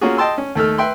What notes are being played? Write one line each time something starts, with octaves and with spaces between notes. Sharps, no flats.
A#3 C#4 F4 F#4 G#4
D#5 G5 A5 C6 E6
C#4
D#2 A3 A4 F6
B4 E5 G5 C6